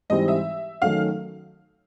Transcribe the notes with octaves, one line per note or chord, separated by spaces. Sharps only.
G#2 E3 G3 C4 D#5
E5
D#3 F#3 A3 C#4 F5